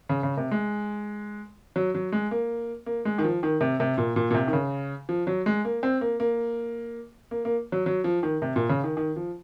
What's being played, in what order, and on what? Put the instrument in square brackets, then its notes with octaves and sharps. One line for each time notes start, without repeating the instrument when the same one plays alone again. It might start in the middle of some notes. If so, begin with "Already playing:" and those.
[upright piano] C#3
C#3
C3
G#3
F#3
F#3
G#3
A#3
A#3
G#3
D#3
F3
D#3
C3
C3
A#2
A#2
A#2
C3
D#3
C#3
F3
F#3
G#3
A#3
C4
A#3
A#3
A#3
A#3
F#3
F#3
F3
D#3
C3
A#2
C#3
D#3
D#3
F3